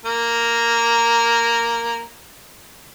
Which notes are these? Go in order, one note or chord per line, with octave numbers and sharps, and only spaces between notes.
A#3 A#4